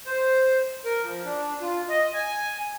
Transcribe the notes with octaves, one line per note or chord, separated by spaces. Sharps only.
C5
A#4
F3
D4
F4
D#5
G#5